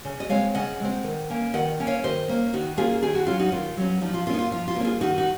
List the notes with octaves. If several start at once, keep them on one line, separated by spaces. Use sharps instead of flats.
C#3
D#5
G#3 C4 C#5 F5
C#3 D#5 F#5
G#3 C4
D#3
A#3 C#4
D#3 D#5 F#5
A#3 C#4
C#5 F5
D#3 C5 D#5
A#3 C#4
D#3 D#4 F#4
A#3 C#4 F4 G#4
D#3 G#4
F#4
F#3 C#4 F4
D#4 F#4
D#3 F4
F#3 C#4
F3 D#4
F4
A#3 C#4 F4
D#4
F4
F3 F4
F4
A#3 C#4
F4 G#4
D#3 D#4 F#4
D#4 F#4